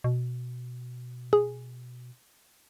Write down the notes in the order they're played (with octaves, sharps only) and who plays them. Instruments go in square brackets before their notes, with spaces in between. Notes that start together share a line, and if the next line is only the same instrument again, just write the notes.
[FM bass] B2
[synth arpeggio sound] G#4